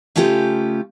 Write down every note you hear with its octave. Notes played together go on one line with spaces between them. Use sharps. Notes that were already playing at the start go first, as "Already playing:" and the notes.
C#3 A3 C#4 F4 G4 C5